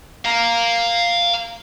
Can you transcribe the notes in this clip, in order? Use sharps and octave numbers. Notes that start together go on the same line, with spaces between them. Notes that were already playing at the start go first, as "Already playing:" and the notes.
F5 A#5